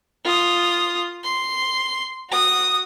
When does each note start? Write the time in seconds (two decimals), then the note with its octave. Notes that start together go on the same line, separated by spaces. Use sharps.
0.24 F4 D#6
1.23 C6
2.30 F#4 D#6